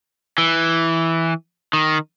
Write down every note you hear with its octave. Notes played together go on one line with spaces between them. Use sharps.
E3
D#3